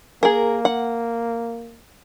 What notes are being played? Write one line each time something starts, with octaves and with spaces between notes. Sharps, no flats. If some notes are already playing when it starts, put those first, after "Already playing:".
A#3 G#4 A#4
F#5